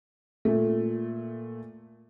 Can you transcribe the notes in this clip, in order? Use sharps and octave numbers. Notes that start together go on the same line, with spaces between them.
A#2 A3